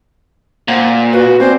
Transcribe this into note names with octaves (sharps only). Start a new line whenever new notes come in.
A#2 C5 F#5
F#4 B4
C4 C5 D5 G#5